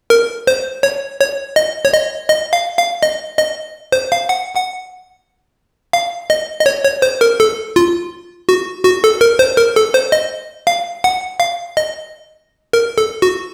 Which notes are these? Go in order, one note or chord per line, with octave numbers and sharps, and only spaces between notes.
A#4
C5
C#5
C#5
D#5
C#5
D#5
D#5
F5
F5
D#5
D#5
C5
F5
F#5
F#5
F5
D#5
D#5
C#5
C#5
C5
A#4
A4
F4
F#4
F#4
A4
A#4
C5
A#4
A4
C5
D#5
F5
F#5
F5
D#5
A#4
A4
F#4